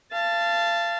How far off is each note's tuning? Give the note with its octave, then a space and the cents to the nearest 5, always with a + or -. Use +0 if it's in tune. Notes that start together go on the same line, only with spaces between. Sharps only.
F5 -30 A5 +0